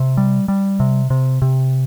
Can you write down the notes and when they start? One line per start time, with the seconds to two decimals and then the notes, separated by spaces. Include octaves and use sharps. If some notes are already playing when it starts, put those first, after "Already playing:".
Already playing: C3
0.17 G3
0.48 G3
0.80 C3
1.10 C3
1.42 C3